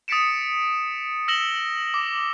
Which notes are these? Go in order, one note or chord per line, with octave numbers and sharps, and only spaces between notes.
D#6 A6 B6 C#7 D7 E7
E6 A#6 E7 F#7 G7
D6